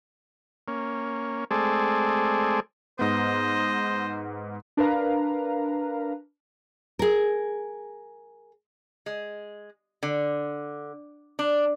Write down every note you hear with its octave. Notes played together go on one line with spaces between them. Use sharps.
A#3 C#4
G#3 A3 C4 G#4 A4 D5
G#2 B3 C5 D#5
D4 A#4 B4 F5 A#5
G#4 A#4
G#3
D3
D4